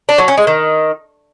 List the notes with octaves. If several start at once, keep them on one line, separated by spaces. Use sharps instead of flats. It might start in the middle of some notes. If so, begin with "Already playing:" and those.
D4
F#3
C#4
G#3
D#3